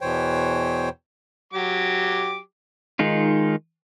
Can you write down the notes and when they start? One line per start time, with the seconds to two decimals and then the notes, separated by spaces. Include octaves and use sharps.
0.01 E2 B2 E3 C5 C#5 G5
1.54 F#3 G4 D6
2.99 D#3 G#3 D#4 F4